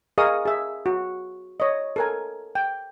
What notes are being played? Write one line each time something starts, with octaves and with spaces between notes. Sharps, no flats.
G#4 A#4 D#5 F5 C#6 D#6
G#4 E5
F#4
C#5 D#5
A4 A#4 G#5
G5